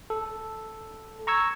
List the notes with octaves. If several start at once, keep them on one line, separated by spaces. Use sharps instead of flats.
A4
A#5 C#6 E6 G#6